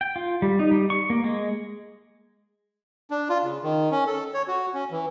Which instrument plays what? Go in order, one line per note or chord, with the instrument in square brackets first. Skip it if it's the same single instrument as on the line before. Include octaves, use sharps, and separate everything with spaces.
[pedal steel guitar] G5
F4
G3
D#4
G3
C#6
A#3
G#3
[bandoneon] D4
F4
C#3
D#3
C#4
A4
C#5
F#4
C#4
E3